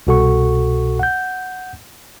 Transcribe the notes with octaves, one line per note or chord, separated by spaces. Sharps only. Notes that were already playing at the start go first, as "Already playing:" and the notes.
C2 B2 F#4 A4 F#5 C#6
F#5 G6